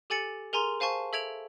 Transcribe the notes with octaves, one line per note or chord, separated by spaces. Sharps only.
G4 A4 G#5 A6 C#7
G#4 A#4 G#5 A#5 C6
C5 F5 G#5 A5 C#6
A4 E5 G#6 D7 F7